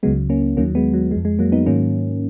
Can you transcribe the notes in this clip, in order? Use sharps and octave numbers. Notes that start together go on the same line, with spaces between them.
C#2 C#3 F#3 G#3 B3
A#3 C#4
D#2 D#3 F#3 A#3 C#4
G#3 B3
F#3
F2 F3 G#3
G#3
F#3 A#3
B3 D#4
G#2 D#3 F#3 A#3 C#4